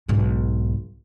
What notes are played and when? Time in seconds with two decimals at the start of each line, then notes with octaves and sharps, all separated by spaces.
0.08 B1 G#2